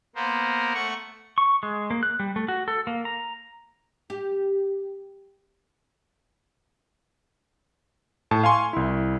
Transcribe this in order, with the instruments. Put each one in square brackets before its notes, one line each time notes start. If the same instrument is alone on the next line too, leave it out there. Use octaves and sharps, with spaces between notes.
[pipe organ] A#3 B3 A#4 C5
A3 F#5 C#6
[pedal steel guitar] C#6
G#3
A#3
F#6
G3
A3
F#4
A4
A#3
A#5
[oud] G4
[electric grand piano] A2 A5
F5 G#5 C6 C#6
C2 E4